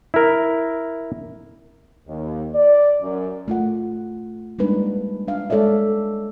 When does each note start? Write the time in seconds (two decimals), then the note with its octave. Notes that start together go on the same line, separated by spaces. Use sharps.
0.14 E4 A#4
2.07 D#2
2.54 D5
3.01 F#2
3.48 A3 F4 F#5
4.59 G3 G#3 A#3 D4 D#4 B4
5.28 D4 F5
5.50 G#3 A4 C#5 D5 E5